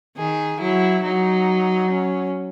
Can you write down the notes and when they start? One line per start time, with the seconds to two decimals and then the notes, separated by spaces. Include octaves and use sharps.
0.17 D#3 G#4
0.60 F#3 E4
1.04 F#3 D#4
1.90 C#4